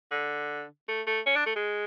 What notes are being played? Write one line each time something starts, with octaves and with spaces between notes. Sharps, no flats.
D3
A3
A3
C#4
D4
A3
G#3